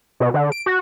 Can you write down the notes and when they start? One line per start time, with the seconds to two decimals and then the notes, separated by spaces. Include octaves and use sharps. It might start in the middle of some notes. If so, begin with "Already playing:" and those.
0.20 B2
0.34 D3
0.52 D7
0.66 F#4